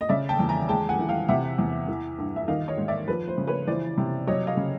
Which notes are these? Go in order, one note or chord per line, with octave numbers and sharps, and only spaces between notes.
D#5
C#3 D5 E5
G5 A5
E2
G#5 A#5
G#3 G5 A5
F#5 G#5
E3
F5 G5
C3 E5 F#5
E2
E3
G2
E5
D#3 D#5 F5
C#5 D#5
G#2
D5 E5
F3 B4
C5
C#3
B4 C#5
E3 C5 D5
C3
F#3 C#5 D#5
D#5 F5
C#3